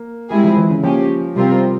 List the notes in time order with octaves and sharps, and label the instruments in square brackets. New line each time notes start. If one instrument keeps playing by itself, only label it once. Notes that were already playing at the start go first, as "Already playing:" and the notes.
Already playing: [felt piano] A#3
[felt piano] G3 [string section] G#3 C4 E4 G#4
[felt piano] F3
E3
C#3
[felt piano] F3 [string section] A#3 C#4 G4
[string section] C3 G3 C4 F4 A#4